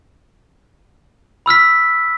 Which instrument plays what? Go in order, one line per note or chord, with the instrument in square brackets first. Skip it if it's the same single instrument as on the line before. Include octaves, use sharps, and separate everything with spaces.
[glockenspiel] B5 E6 F6 B6